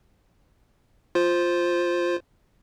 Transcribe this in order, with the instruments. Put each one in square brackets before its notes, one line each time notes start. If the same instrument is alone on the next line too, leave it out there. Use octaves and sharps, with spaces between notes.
[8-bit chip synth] F4 C5